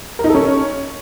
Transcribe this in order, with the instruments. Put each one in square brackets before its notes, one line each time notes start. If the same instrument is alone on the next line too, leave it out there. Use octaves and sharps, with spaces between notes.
[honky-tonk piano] A#4
D#4
A4
C#4